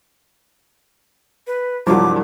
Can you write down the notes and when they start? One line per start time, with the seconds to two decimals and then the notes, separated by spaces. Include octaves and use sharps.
1.47 B4
1.87 C2 G2 F3 F#3 D6